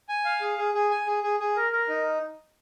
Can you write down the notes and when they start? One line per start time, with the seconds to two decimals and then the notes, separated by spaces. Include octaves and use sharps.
0.09 G#5
0.25 F5
0.41 G#4
0.58 G#4
0.74 G#4
0.91 G#5
1.07 G#4
1.23 G#4
1.40 G#4
1.56 A#4
1.73 A#4
1.88 D#4